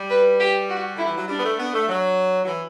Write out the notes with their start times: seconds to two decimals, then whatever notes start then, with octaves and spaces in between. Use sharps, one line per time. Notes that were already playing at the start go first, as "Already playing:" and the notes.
Already playing: G3
0.10 B4
0.40 G4
0.69 F#4
0.97 D3 E4
1.07 E3
1.18 F#3
1.28 G3 D4
1.38 B3
1.44 A3
1.59 B3
1.74 A3
1.89 F#3
2.44 F#3
2.47 E3